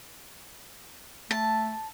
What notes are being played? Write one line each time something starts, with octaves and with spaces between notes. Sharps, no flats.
A3 A5